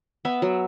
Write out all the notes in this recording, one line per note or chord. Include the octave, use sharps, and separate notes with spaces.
B3 E5
F#3